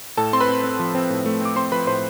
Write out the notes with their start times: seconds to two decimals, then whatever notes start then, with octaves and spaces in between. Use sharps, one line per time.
0.17 A2 A4 A5
0.33 C4 C6
0.40 B4 B5
0.49 C4
0.64 C4
0.79 F3
0.95 C4
1.10 A2
1.26 A3
1.41 C4 D6
1.56 C4 C5 C6
1.72 F3 B4 B5
1.87 A2 C5 C6